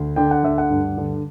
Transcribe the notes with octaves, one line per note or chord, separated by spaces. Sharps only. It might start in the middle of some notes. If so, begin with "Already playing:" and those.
Already playing: D2
D3 G5
F#5
D2 E5
F#5
G2
D3